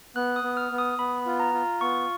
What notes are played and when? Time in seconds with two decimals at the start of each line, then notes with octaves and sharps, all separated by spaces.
0.16 B3 F#6
0.36 D#6
0.43 B3
0.57 F6
0.71 B3
0.78 D#6
0.98 B3 B5
1.26 F4
1.40 A#5
1.54 F4
1.81 B3 C#6